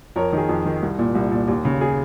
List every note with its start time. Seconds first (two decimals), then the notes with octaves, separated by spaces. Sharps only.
0.16 F2 A#4 C#5
0.33 D#3 G#4
0.49 F2
0.66 D#3
0.82 C2
0.98 A#2
1.15 C2
1.31 A#2
1.48 D#2
1.65 C#3
1.81 G#4